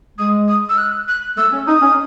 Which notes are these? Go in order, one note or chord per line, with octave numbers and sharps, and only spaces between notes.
G#3 D#6
D#6
E6
F#6
F#6
A3 E6
C#4
D#4 D#6
C#4